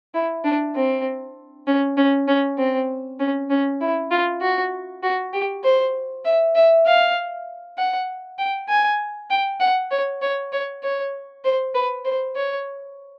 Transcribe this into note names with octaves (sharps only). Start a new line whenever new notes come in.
E4
D4
C4
C#4
C#4
C#4
C4
C#4
C#4
E4
F4
F#4
F#4
G4
C5
E5
E5
F5
F#5
G5
G#5
G5
F#5
C#5
C#5
C#5
C#5
C5
B4
C5
C#5